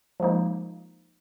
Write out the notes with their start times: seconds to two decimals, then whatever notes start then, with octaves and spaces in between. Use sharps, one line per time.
0.20 F3 G#3 A#3 D#4